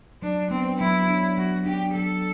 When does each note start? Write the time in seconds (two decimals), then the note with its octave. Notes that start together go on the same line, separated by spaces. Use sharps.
0.22 F#3 D4
0.51 B3 C4 D4
0.79 F#3 E4
1.08 B3 D4
1.37 F#3 F#4
1.66 B3 D4 G4
1.95 F#3 A4